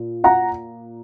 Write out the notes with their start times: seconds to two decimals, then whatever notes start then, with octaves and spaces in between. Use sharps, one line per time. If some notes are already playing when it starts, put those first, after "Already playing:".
Already playing: A#2
0.24 F#5 A#5